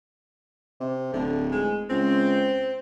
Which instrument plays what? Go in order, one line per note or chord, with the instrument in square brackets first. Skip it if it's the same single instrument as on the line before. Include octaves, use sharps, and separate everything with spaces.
[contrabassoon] C3
[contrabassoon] D1 [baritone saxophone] D3
[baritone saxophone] G#3
[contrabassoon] C#2 [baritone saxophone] C4